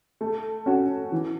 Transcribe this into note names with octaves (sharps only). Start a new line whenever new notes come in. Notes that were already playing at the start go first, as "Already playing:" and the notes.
A3
C#4 F#4
E3